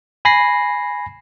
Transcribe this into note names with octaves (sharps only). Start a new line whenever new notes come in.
G#5 B5 A#6 C7